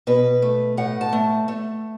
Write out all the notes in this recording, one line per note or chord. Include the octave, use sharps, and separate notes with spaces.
B2 B4
A3
A2 F#5
A5
A3
A3